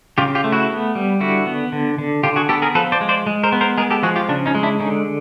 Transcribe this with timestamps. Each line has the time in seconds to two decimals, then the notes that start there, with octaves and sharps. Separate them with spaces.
0.18 C#3 F4 G4
0.35 F4 G4
0.44 A3
0.52 E4 F#4
0.70 B3
0.95 G3
1.20 D3 E4 F#4
1.47 B3
1.72 D3
1.99 D3
2.23 D3 F4 G4
2.36 F#4 G#4
2.49 B3 G4 A4
2.62 G#4 A#4
2.75 F3 A4 B4
2.92 C5 D5
3.01 G#3
3.09 C5 D5
3.27 G#3
3.43 A#4 C5
3.52 B3
3.61 A#4 C5
3.77 G#3 G#4 A#4
3.90 G4 A4
4.03 F3 F#4 G#4
4.16 F4 G4
4.29 C#3 D4
4.46 C#4 D#4
4.55 G#3
4.63 D4 E4
4.80 D3 C#4 D#4